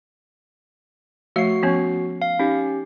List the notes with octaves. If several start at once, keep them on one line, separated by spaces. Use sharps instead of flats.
F3 A3 F#4 F5 C7
F3 B3 C#4
F5
C#4 D#4 G4